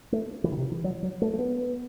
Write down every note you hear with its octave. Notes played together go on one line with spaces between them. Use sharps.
A3
E3
D#3
C3
E3
F#3
F#3
A3
A3
B3